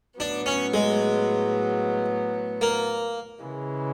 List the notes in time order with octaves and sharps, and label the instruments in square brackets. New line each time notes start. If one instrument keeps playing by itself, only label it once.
[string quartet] A2 F#3 B3 [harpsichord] D4
[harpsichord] C#4
G#3
A#3
[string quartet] C#3 E3 G#3